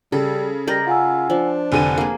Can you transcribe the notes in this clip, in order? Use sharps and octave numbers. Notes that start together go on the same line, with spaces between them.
C#3 G3 A4
G3 A#4 D5 D#5 G6 A#6
F4 F#5 G#5 E6
F3 D4
F1 D3 G#5 D#7
A#3 G#4